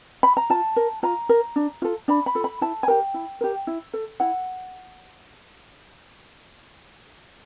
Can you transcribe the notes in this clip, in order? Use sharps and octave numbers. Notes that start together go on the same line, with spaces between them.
B5
A#5
F4 A5
A#4
F4 A#5
A#4
D4
F4 A4
D4 B5
B5
F4 A4
B5
E4 A5
G#5
G4 A#4 G5
E4
G4 A#4
E4
A4
E4 F#5